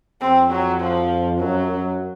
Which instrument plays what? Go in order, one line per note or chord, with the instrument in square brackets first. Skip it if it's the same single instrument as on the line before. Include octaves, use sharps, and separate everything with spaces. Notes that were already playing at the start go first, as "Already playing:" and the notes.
[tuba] F2 [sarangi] C4
[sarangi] F#3
F3
[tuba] F#2 [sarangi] F#3
[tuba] F#2